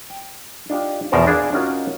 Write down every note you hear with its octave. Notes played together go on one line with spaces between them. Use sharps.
G5
D4 D#4 F4 G4
E2 B2 F3 A#4 C5 A5
D4 G#4 F5
C#4 D#4 F4 F#4 A#4